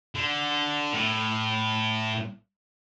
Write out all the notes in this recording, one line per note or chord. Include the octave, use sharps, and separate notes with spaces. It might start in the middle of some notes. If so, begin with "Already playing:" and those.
D3
A2